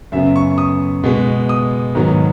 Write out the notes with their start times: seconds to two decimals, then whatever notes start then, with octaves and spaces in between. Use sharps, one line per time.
0.12 F#2 C#3 F#3 B3 E5
0.36 C#6
0.58 D#6
1.04 B2 G#3 B3
1.49 D#6
1.95 G#2 D#3 F#3 B3